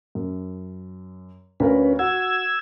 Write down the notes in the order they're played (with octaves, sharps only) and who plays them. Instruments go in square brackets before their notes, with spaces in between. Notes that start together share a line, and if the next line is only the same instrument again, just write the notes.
[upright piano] F#2
[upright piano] D2 A#4 F5 [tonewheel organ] C#4 B4
[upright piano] F#4 [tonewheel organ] E6 G#6